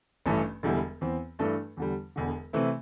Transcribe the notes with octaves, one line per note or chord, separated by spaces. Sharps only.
A1 G2 E3 A3
E1 E2 D3 G3 E4
E2 E3 C4
G2 E3 A3 D4 A4
E2 D3 G3
E1 E2 D3
C3 E3 A3 C4 E4